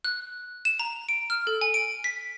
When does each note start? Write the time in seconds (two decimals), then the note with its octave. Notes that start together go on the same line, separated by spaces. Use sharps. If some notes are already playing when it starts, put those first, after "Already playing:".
0.05 F#6
0.65 E7
0.79 A#5
1.09 D7
1.30 F6
1.47 A4
1.61 G#5
1.74 D7
2.04 B6